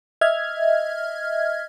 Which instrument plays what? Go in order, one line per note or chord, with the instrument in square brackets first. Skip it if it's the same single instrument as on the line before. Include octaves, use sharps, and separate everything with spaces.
[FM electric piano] D#5 E5 F6 G#6